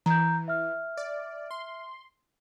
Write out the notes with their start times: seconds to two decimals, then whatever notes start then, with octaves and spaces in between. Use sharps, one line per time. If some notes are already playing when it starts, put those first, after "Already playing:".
0.06 E3 A#5 G6
0.48 E5 F6
0.97 D5
1.51 C6